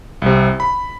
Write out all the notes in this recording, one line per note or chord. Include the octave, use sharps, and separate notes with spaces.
C2 C3
B5